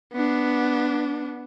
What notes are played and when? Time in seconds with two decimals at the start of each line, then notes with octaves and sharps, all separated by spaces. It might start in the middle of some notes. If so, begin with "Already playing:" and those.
0.13 B3 D4